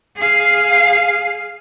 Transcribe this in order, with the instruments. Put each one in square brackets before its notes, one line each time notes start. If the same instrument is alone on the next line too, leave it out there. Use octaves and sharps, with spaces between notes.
[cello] G#4 F5